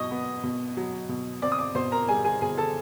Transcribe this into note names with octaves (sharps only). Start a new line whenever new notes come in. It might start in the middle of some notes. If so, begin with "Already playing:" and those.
Already playing: B2 F#3 D#5 C#6 D#6
B3
B2
F#3
B2
C4 D5 D6
D#6
D5 D6
B2 C5 C6
A#4 A#5
G3 G#4 G#5
G#4 G#5
B2 G#4 G#5
A4 A5